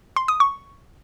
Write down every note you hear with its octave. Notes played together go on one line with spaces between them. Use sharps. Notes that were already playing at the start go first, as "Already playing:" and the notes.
C6
D#6
C#6